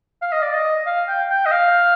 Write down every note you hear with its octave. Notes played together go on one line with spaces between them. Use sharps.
F5
D#5
D5
D#5
F5
G5
G5
D#5
F5